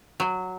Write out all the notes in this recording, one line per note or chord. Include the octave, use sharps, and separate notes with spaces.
F#3